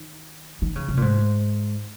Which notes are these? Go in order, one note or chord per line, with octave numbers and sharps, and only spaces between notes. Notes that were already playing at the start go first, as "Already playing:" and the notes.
Already playing: D#3
D#3
C#3
C3
A#2
G#2